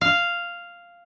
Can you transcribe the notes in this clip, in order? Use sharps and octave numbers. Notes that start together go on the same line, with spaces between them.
F5